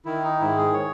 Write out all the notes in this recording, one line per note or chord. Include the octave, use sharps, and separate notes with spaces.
D#3 E4
D#4
G#2 E4
G#4
C#5